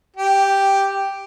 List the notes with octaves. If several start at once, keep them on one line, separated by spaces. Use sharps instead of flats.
G4